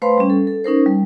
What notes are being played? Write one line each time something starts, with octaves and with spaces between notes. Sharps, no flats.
A3 B4 C5 F5 B5 C6
G3 C#4
A4
A4
C#4 D#4 A#4 C5
G3